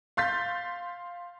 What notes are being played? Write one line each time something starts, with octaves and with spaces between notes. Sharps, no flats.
F5 C6 G6 A6 B6